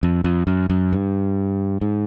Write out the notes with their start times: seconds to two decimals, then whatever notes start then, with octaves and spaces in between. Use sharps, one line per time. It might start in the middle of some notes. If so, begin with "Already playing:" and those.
0.03 F2
0.24 F2
0.47 F#2
0.70 F#2
0.93 G2
1.81 G#2